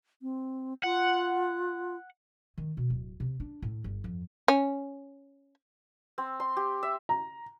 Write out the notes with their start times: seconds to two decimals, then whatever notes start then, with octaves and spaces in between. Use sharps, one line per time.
0.22 C4
0.83 F4 F#5
2.58 D#3
2.77 B2
2.90 D1
3.20 C3
3.40 D4
3.62 A2
3.84 G1
4.04 F2
4.48 C#4
6.18 C4
6.40 C6
6.57 G4
6.83 E5
7.09 A#5